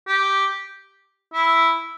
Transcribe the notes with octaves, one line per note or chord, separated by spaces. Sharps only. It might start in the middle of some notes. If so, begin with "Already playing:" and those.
G4
E4